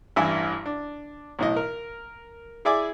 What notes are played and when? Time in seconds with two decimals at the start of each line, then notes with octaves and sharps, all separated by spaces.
0.16 A1 G2 E4 G#5 E6
0.66 D4
1.39 B1 A2 D#5
1.56 A#4
2.65 E4 G#4 D5 E5 G#5 D6